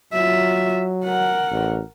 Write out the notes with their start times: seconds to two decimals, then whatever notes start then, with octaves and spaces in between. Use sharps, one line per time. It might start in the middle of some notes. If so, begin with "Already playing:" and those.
0.13 F#3 F4 E5
1.04 A#4 F#5
1.51 A1